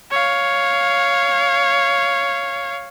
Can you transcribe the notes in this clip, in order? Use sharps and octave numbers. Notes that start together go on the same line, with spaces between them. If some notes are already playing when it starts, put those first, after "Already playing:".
C#5 F5